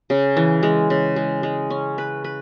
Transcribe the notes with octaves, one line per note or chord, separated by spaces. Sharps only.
C#3
E3
G#3
C#3
G#3
G#3
C#4
B4
B4